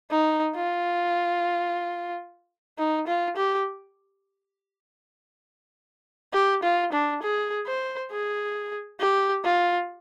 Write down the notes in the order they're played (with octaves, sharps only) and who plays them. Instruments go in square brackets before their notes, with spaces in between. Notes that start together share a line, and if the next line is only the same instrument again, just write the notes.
[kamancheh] D#4
F4
D#4
F4
G4
G4
F4
D4
G#4
C5
G#4
G4
F4